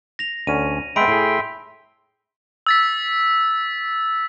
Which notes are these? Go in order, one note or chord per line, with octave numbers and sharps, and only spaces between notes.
A#6 F7
D2 C#4 D#7
G#3 B3 E5 G5 B5 C6 D7
A2 G#4
E6 A6 B6